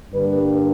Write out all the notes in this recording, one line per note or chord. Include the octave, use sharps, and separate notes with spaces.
G2 D3 G3 A#3 D4 B4